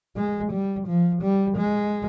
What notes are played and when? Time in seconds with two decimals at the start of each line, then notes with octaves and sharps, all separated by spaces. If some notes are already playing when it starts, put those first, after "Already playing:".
0.16 G#3
0.52 G3
0.87 F3
1.22 G3
1.57 G#3